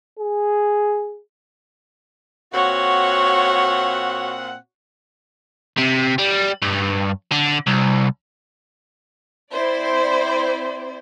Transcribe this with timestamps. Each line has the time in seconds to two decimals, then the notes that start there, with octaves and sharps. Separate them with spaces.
0.19 G#4
2.53 A#2 C4 F#4 C#5 F#5
5.78 C3
6.19 G3
6.62 G2
7.32 D3
7.67 C2
9.52 C4 E4 C5 D5